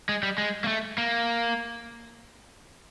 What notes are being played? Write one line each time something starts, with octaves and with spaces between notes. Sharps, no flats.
G#3
G3
G#3
A#3
A3
A#3